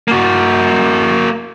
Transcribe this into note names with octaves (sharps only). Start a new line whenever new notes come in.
A#3 F#4